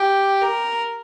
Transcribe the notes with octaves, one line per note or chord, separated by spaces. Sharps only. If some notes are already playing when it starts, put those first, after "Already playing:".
Already playing: G4
A#4